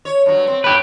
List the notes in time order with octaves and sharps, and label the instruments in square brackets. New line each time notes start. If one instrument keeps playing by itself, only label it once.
[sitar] C#5
G2 F#3
C4
[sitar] A3 [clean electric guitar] G4 B4